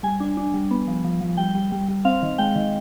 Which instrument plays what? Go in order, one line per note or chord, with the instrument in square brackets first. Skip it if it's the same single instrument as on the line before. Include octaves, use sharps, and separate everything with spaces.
[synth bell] G3 G#5
D4
D4
G3
B3
F3
F3
F3
G3 G5
G3
G3
G3
C4 F5
D#3
G#3 G5
D#3